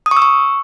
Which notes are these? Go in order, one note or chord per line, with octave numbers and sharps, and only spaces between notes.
D#6
C#6
E6
C#6